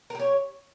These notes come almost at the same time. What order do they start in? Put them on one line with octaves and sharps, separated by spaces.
A#4 G4 C#5